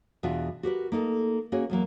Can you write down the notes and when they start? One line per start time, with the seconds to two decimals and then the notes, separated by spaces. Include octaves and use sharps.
0.23 E2 B2 D4 F4 E5
0.63 F#4 G4 A#4 B4
0.92 A#3 D#4 A4
1.52 A#3 C#4 F#4 G#4 C#5
1.70 E2 F#3 A#3